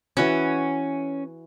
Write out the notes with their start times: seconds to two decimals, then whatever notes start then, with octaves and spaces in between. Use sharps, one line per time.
0.17 E3 C#4 F#4 B5